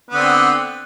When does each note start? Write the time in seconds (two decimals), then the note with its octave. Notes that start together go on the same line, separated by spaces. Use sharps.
0.10 B3
0.14 D3
0.17 C4